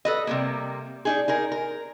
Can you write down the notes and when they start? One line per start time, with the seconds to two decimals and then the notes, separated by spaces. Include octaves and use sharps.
0.05 A4 B4 D#5
0.27 C3 G3 A#3
1.05 D4 D#4 G#4
1.28 D#4 G#4 A#4
1.52 A#4